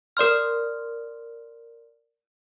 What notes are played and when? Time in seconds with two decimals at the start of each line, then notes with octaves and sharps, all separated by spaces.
0.17 A#4 D5 C6 F6